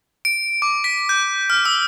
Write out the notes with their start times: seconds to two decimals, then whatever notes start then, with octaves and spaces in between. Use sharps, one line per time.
0.25 D7
0.62 D6
0.84 B6
1.09 G6
1.50 F6
1.65 E6